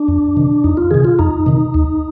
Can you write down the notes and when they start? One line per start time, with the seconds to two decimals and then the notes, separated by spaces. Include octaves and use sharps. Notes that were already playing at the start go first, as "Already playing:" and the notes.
Already playing: D4
0.08 F2
0.37 C3 D#3
0.64 F2 D#4
0.77 F4
0.91 C3 D#3 G#4
1.04 F4
1.19 F2 D#4
1.46 C3 D#3
1.74 D#2